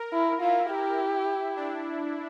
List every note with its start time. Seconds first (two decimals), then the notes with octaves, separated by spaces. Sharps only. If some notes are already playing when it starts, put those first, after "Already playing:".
Already playing: A#4
0.13 E4
0.41 E4 F4
0.70 G4
1.56 D4